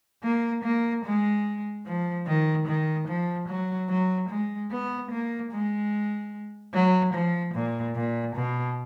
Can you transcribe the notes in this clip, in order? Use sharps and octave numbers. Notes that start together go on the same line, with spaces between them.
A#3
A#3
G#3
F3
D#3
D#3
F3
F#3
F#3
G#3
B3
A#3
G#3
F#3
F3
A#2
A#2
B2